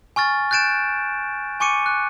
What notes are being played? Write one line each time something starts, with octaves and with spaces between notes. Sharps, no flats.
G#5 C#6 F6 A6
F#6 G6 A6 D7 E7
G#5 C#6 D6 C#7 D#7
F#6